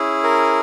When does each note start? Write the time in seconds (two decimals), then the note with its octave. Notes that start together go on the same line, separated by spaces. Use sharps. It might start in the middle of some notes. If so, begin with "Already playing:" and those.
Already playing: C#4 E4 G#4
0.24 A#4